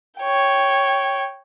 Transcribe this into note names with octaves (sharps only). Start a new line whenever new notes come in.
C#5 G5